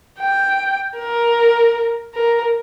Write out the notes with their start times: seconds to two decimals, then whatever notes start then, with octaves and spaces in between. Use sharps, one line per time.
0.19 G5
0.97 A#4
2.14 A#4